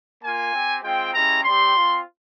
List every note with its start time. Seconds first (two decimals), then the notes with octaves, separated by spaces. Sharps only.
0.23 A#3 F4 G#5
0.53 C4 G4
0.83 G#3 C4 F4 G5
1.14 G#3 C#4 E4 G4 A#5
1.44 G3 C4 G4 C6
1.74 C4 F4